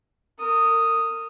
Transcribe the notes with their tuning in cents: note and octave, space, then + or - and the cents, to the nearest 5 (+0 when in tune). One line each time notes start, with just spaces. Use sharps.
A#4 -35 D#6 +0